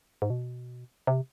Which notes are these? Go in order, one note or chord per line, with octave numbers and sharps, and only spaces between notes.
G#2
B2
C3